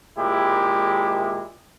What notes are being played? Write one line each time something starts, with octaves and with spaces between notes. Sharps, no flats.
G#1 A#2 G#3 E4 G4